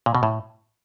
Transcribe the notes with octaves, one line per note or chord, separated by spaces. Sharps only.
A#2
B2
A2